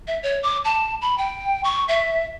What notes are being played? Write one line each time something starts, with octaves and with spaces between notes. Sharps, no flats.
E5
C#5
D6
A5
B5
G5
C#6
E5